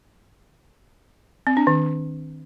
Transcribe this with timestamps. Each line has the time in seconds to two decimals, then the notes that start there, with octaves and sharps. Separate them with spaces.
1.47 C4
1.57 D4
1.67 D#3